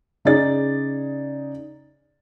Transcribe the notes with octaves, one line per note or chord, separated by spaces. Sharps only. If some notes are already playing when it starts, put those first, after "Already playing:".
C#3 D#4 G#4 D5 A6